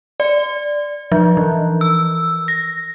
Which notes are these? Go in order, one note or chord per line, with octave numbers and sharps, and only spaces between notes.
D5
F3
E3
E6
A#6